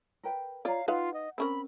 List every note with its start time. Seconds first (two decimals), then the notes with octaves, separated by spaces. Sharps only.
0.23 A#4 B4 G5
0.65 F4 C#5 D5 F5 A#5
0.88 D#4 F4 B4 F5 F#5
1.14 D#5
1.38 C4 C#4 A#4 B5